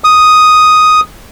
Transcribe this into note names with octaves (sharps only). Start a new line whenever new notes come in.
D#6